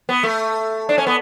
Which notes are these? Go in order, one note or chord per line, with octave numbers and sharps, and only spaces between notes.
B3
A3
D4
C#4
B3